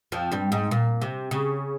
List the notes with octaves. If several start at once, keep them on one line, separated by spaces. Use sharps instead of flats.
F2 F3
G2 G3
G#2
A#2
C3
C#3